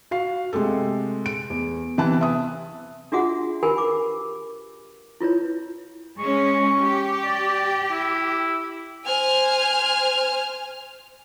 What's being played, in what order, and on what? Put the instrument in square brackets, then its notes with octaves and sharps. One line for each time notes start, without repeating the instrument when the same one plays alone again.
[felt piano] F#4 F5 C7
C3 G#3 A3 G4 A4
D7
E2
C3 E3 B3 A5 F#6
E5 D#6
[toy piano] D4 F4 F#4 G#4 E5 F#5
G4 A#4 B4 G#5 B5
D6
E4 F4 B4 C#5
[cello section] G#3 C#4 [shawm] C#6
[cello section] G4
[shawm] D5
E4
[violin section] C5 G#5 F6